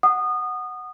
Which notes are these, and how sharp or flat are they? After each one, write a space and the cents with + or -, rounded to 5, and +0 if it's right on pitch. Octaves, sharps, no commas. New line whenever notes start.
F#5 +0 D#6 -25